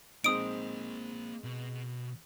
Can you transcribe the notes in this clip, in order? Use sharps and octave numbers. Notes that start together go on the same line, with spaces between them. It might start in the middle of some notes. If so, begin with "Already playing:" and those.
G#3 A#3 C4 D#4 C5 D#6 D7
B2